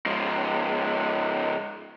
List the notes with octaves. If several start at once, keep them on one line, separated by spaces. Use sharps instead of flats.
G#2 F3